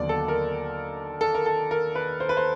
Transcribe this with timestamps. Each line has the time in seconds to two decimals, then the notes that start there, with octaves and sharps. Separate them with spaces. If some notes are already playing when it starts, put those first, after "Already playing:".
Already playing: D#2 D3 F#3 B3 D5
0.09 A4
0.28 A#4
1.21 A4
1.35 A#4
1.46 A4
1.71 A#4
1.95 B4
2.20 C5
2.29 B4
2.37 C5